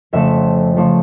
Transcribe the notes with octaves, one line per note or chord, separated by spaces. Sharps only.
F2 C#3 F3 A3 E5
C#3 F3 A3